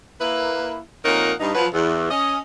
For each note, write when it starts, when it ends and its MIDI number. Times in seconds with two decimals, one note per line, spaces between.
0.21 0.79 58
0.21 0.79 64
0.21 0.79 71
1.05 1.34 41
1.05 1.34 46
1.05 1.34 63
1.05 1.34 70
1.05 1.34 73
1.05 1.34 78
1.40 1.52 43
1.40 1.52 63
1.55 1.67 53
1.55 1.67 54
1.55 1.67 71
1.73 2.10 40
2.11 2.39 61
2.11 2.39 75